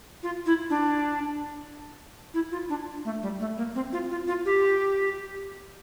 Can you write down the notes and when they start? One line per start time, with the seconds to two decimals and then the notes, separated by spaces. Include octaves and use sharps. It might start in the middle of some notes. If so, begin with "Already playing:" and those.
0.23 F4
0.46 E4
0.70 D4
2.34 E4
2.52 F4
2.69 D4
3.05 A3
3.22 G3
3.40 A3
3.57 A#3
3.75 C4
3.93 F4
4.11 F4
4.27 F4
4.45 G4